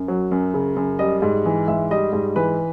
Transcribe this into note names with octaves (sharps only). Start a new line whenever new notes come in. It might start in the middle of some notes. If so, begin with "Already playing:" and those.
Already playing: F#2
F#3
F#2
C#3
F#2
G3 D#5
G#2
E3
G#2 E5
G3 D#5
G#2
E3 B4